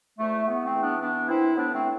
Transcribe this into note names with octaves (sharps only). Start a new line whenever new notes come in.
E2 A3
E2 B3
A3 C4
E2
B3 D4
E3 B3 D4
E3 C4 E4
A2 B3 D4
A3 C4
A2